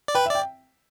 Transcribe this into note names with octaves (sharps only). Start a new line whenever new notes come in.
D5
B4 G5
E5
D5 G5